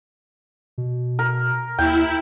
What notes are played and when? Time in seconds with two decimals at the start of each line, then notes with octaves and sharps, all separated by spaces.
0.78 B2
1.19 A#4
1.78 D#2 E4 G5